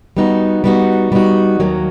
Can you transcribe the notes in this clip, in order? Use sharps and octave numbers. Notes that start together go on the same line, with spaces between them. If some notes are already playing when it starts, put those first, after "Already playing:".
G3 B3 D#4 F#4
G3 B3 D#4 F#4
G3 B3 D#4 F#4
D#2 D#3 F#3 A#3